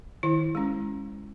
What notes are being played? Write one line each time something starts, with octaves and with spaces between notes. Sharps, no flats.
D#3 E4
G#3 C#4